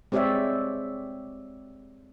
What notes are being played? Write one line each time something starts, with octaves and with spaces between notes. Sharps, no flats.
G#3 C4 G4 C#5 D5 E5